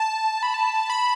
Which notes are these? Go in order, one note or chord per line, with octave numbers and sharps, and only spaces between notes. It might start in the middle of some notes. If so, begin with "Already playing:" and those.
Already playing: A5
B5
A5
B5